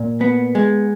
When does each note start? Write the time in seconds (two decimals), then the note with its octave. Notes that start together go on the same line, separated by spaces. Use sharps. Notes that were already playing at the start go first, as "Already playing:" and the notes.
Already playing: A#2
0.21 B3
0.55 G#3